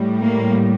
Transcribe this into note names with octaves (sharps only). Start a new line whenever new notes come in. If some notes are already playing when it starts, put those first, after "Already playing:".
Already playing: A2 G3
A#3